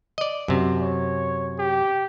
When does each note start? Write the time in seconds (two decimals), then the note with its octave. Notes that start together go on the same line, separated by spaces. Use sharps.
0.18 D5 D#5
0.48 F#2 C3
0.82 C#5
1.59 G4